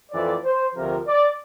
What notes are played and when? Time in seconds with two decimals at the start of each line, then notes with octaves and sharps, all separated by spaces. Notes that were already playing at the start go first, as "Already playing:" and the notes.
0.12 F2 E3 A3 C4 D5
0.43 C5
0.75 D2 C3 F3 A#4
1.07 D5